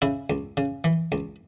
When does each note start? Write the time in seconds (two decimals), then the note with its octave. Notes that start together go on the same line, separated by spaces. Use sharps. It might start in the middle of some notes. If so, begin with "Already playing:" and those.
0.02 C#3 E4
0.30 C#2
0.57 C#3
0.84 E3
1.12 C#2